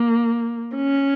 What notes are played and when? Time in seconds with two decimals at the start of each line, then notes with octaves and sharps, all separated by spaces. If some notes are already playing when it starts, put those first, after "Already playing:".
Already playing: A#3
0.76 C#4